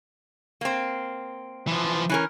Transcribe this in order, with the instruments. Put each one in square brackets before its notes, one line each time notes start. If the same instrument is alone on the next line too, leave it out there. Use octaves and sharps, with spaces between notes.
[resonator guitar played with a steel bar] A#3 C4
[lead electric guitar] E3 F3
[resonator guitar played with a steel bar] E3 C#4 A#4